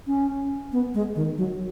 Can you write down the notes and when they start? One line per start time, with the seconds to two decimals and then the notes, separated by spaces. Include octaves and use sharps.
0.07 C#4
0.72 B3
0.94 G#3
1.15 D#3
1.38 F#3